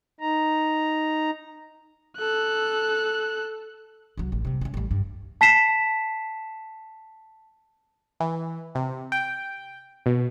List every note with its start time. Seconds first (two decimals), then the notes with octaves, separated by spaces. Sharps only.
0.20 D#4 A#5
2.17 A4 F#6
4.17 C2 F#3
4.32 A1
4.45 C3 G3
4.61 C4 C#4
4.74 A1 G3
4.91 G2
5.41 A5 B6 C7 E7
8.20 E3
8.75 C3
9.12 G5
10.06 B2